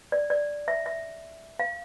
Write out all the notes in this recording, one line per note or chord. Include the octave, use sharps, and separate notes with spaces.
D5
D5
E5
E5
F5